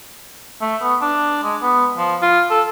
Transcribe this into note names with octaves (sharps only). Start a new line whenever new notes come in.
A3
B3
D4
G#3
B3
F3
F4
A4